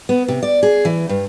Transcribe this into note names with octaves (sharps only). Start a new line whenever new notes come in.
B3
C3
D5
G#4
E3
G2